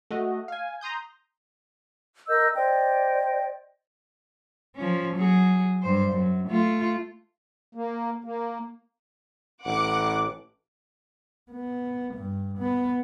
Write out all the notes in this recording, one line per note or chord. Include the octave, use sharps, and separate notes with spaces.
A3 F#4 D#5
F5 G#5
A#5 C6 D#6 G6
A#4 D#5 E6 G6
C5 D5 D#5 G5
F3 C#4
F#3 G#4
G2 C5
F#2
A3 F4
A#3
A#3
A1 F#5 D6
B3
G2
B3